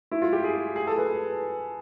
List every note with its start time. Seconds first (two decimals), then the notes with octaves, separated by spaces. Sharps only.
0.12 E4
0.22 F4
0.33 G4
0.44 G#4
0.76 G#4
0.87 A4
0.98 B4